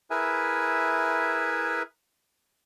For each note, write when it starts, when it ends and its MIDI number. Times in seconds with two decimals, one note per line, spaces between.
0.11 1.83 64
0.11 1.83 68
0.11 1.83 70
0.11 1.83 71
0.11 1.83 76
0.11 1.83 80